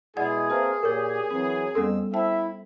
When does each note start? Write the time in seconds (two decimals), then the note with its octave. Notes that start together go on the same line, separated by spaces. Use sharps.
0.17 B2 G#3 E4 G#4 D5 D#5 F#5
0.50 A#3 C4 A#4 B4 E5 A5
0.83 A#2 G4 A#4 C#5
1.31 E3 F#3 C4
1.75 F2 G3 B3 C#4 A4 E6
2.13 E4 C5 E5 G5 A5